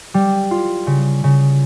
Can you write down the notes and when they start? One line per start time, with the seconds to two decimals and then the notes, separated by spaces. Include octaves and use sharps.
0.14 G3
0.51 F4
0.87 C#3
1.24 C#3